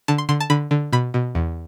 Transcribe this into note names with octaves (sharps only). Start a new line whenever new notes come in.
D3 A5
C6
D3 C6
A5
D3 B5
D3
B2 B5
B2
E2